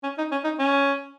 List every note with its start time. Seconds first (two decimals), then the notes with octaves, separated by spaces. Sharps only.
0.03 C#4
0.18 D#4
0.31 C#4
0.44 D#4
0.59 C#4